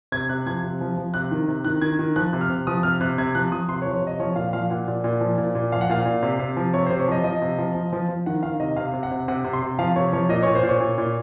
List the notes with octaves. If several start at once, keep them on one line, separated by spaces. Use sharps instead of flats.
C3 G#6
C3 F#6
F3 G#6
C3
F3
F3
C3 F#6
D#3
C3
D#3 F#6
D#3 G#6
D#3
F3 F#6
C3
F6
C3
F3 D#6
C3 F6
C3 F#6
C3 G#6
F3 F#6
F3 D#6
C3 C6
C#5
F3
C#5
C3 D#5
F3 C#5
A#2 F5
F3 F5
A#2 F#5
A#2
A#2
F3
A#2
A#2
F3 F5
F#5
A#2 F5
A#2
C3
C3
F3
C3 C#5
C5
C3
C#5
F3 D#5
F3 D#5
C3
F3
F3
F3
F3
D#3 F#5
D#3 F5
C3 D#5
C3 F5
C3
F#5
C3
C3 F#5
C3
C6
C3
F3 F5
C3 C#5
F3 C#5
A#2 D#5
A#2 C#5
C5
A#2
C#5
A#2
A#2